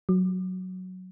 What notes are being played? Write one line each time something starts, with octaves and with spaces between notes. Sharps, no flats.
F#3